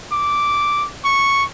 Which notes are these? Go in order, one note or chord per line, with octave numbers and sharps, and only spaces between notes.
D6
C#6